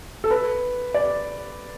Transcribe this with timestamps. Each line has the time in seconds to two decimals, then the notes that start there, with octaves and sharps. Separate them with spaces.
0.24 A4
0.31 B4
0.94 D5